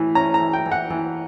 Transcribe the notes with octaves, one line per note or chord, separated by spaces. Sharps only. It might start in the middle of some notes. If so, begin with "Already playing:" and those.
Already playing: A2 E3
C#4 A#5
A#5
E3
G5
E3
F#5
E3